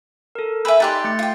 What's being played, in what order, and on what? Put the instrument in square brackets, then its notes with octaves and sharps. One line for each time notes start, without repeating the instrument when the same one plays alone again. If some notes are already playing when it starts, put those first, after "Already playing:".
[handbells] A4 A#4
[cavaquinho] B4 E5 [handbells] G#5 B5 E6
[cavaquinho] D#4 G4 D5 [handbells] C6 F#6 A6
[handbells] A3 A6 C#7
[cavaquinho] F4 G5